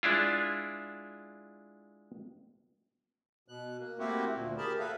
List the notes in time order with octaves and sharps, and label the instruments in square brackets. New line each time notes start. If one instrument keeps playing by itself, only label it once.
[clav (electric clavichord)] G#3 D4 E4 F4
[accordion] B2 F#6
A#3
A3 A#3 C4 E4 F#4 G4
D2 A#2
G4 G#4 A#4 A5 B5
F#4 A4 B4 C#5 E5 F5